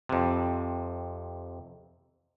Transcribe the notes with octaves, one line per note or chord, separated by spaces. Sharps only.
F2 C3